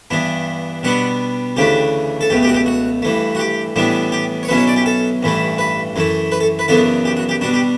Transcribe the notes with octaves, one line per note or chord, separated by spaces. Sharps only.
G2 E3 B3 D4
B2 G3 B3 D4 F#5
D2 C#3 E3 A3 D4 G4
A4
C#2 B2 A3 G4
G4
F#4
G4
F#4
G2 E3 A3
F#4
G4
A2 E3 G3 B3 D4
G4
C#5
B1 B2 F#3 C#4 E4 B4
C#5
D5
G4
A4
A1 G2 E3 A3 E4
B4
F#2 E3 A3 E4
B4
A4
B4
F#2 C#3 E3 B3 D4 A4
G4
F#4
G4
B2 G3 D4 F#4
G4